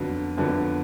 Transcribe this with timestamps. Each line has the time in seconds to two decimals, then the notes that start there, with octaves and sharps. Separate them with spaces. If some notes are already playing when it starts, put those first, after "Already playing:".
Already playing: F2 D3 F#3 B3
0.38 F2 D3 F#3 B3